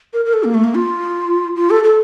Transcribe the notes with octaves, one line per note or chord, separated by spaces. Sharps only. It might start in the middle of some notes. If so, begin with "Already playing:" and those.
A#4
A#4
A4
A#3
A3
A#3
F4
F4
A4
A4